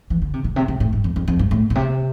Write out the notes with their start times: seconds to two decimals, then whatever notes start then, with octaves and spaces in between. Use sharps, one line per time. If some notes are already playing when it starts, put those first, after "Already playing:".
0.10 E3
0.22 D3
0.33 C3
0.44 A#2
0.56 C3
0.68 C3
0.80 A2
0.93 G2
1.04 F2
1.16 F2
1.28 F2
1.39 G2
1.51 A2
1.70 A#2
1.75 C3